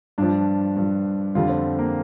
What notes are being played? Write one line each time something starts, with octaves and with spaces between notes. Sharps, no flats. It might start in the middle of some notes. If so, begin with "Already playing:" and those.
G2 F3 D4
G2 F3
F2 D3 G3 F4
C4
A#3